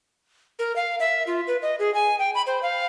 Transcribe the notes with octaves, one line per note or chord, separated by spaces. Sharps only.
A#4
F5
E5
F4
B4
D#5
G#4
G#5
G5
B5
C5
F5